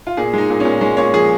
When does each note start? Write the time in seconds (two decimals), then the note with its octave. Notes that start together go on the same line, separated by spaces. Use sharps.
0.07 F4
0.17 A#2 G#4
0.33 G#3 D#4
0.50 A#2
0.60 A#2 C#4
0.81 G#3 C#4
0.97 A#2 C#5
1.14 F3 G#4